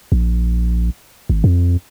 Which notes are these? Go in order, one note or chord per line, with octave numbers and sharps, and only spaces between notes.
A#1
G#1
F2